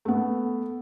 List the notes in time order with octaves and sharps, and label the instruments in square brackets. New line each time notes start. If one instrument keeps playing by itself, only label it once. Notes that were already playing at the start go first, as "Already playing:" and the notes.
[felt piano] A3 B3